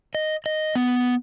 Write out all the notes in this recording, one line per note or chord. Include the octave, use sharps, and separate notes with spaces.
D#5
D#5
B3